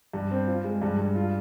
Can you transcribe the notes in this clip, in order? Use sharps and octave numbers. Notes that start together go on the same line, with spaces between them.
G2
C4
F4
G#3
G2
G2
F4